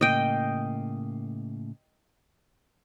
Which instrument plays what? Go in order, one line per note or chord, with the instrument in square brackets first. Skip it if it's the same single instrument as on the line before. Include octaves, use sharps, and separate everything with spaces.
[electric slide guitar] A2 C#3 A#3 [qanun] D#5 G5